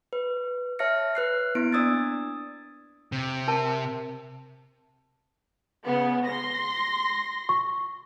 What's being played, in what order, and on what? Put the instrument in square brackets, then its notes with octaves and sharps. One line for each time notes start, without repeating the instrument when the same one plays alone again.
[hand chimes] B4
C#5 E5 A5 F6 A#6 C#7
B4 F#6 C7
A#3 B3 E4 D7
D4 D5 D#6 E6 G#6 A6
[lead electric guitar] C3
[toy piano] A#4 A5
[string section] C#3 B3
C6 A#6
[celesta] C#6